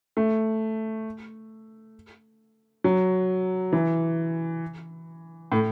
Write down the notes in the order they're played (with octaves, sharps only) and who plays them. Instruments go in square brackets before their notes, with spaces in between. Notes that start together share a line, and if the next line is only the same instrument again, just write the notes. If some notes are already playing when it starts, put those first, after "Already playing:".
[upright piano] A3
F#3
E3
A2